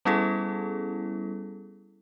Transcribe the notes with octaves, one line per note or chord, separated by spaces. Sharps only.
G3 B3 C#4 E4 G#4 A4